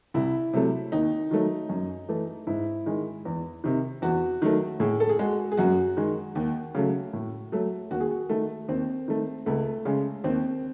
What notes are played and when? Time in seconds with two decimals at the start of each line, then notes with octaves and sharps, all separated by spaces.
0.14 C2 E4
0.54 C3 F#3 A3
0.92 D#2 D#4
1.31 D#3 F#3 A3
1.69 F#2
2.09 E3 A3
2.47 G#2 E4
2.86 D#3 G#3
3.25 E2
3.64 C3 D#3
4.02 E2 F#4
4.42 D#3 F#3 A3
4.80 A2 G#4
5.00 A4
5.09 G#4
5.19 G#3 F#4
5.52 G#4
5.57 F#2 F#4
5.97 D#3 G#3
6.35 D#2
6.75 C#3 F#3 A3
7.13 A2
7.52 F#3 A3
7.91 D#2 F#4
8.00 G#4
8.11 F#4
8.29 D#3 A3
8.68 D#2 C4
9.08 D#3 A3
9.46 C#2 A3
9.85 C#3 G#3
10.24 D#2 C4